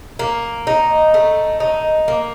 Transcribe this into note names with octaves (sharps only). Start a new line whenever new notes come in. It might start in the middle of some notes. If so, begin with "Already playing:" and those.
A#3
D#4
A3
D#4
A#3